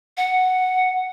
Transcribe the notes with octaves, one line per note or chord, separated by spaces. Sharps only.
F#5